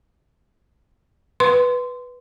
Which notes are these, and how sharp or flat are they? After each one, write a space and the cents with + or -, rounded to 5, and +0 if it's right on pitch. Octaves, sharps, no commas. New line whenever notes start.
B4 +0 C6 -15